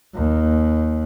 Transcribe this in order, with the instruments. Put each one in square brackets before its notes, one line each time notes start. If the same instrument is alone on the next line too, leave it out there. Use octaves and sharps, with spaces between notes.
[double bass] D#2